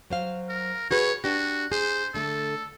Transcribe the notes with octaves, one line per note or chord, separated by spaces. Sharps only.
F#3 C5 F5
A#4
F#4 G#4 B4 C#5
D4 F#4 G4
G#4 C5
D3 A3 A4